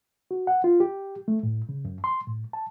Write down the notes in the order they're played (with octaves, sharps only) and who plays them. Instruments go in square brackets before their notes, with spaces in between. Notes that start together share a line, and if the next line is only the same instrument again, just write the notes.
[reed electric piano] F#4
F#5
F4
G4
A3
A2
C#3
F#2
C6
A2
A5